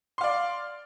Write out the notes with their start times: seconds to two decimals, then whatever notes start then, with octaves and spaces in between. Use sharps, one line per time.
0.18 C6
0.21 F5
0.24 D5